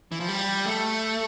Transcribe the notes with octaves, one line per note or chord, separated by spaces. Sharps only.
E3
F3
G3
A3